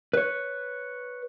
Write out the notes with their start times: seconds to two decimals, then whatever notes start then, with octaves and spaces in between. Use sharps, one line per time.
0.13 B4 C#5